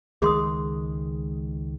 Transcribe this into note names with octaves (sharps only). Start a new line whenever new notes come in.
C#2 D#3 G#3 G#4 C6 D#6